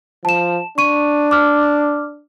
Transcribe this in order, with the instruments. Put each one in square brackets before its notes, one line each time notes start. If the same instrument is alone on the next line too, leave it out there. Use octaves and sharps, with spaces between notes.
[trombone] F3 [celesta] A5 E7
[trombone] D4 [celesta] C#6 D#7
[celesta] D6 F6